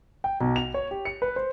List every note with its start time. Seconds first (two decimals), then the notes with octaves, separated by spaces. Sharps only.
0.24 G5
0.41 B1
0.56 F7
0.74 C#5
0.91 G4
1.05 C#7
1.22 B4
1.36 C5